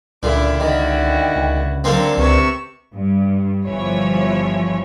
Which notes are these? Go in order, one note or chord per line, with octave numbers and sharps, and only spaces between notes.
C#2 A#2 D3 E4 D6
D3 D#3 E4 F#4 G5
C#2
D3 F#3 A#3 C4 A4 A#4
C#2 C3 B4 C#6 E6
G2
G1 E3 F3 C#5